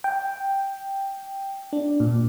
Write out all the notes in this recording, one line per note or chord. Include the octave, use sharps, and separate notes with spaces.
G5
D4
A#2